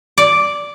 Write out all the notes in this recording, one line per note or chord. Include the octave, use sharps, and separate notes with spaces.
D5